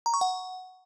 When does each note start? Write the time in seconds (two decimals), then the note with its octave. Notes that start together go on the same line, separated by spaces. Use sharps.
0.06 A#5
0.14 C#6
0.21 F#5